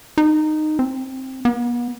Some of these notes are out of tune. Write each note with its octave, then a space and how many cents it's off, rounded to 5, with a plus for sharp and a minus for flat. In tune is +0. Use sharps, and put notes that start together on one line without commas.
D#4 -15
C4 +10
B3 -40